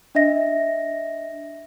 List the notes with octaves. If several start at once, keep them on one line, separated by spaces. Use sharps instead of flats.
D4 D#5 E5 A#6